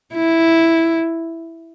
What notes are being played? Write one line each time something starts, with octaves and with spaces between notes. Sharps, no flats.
E4